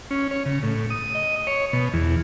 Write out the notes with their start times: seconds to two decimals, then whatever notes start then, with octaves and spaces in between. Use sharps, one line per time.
0.11 C#4
0.31 C#5
0.46 C#3
0.63 A2
0.90 D#6
1.15 D#5
1.47 C#5
1.73 B2
1.93 E2